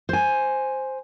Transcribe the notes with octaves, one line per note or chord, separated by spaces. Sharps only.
C5 G#5